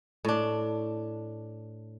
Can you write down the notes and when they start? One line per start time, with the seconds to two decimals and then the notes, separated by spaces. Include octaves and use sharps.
0.25 A2 D4